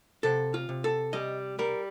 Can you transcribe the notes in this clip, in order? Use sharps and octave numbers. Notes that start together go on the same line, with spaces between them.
C3 A4
F4
C3
A4
G3 D#5
G3 A#4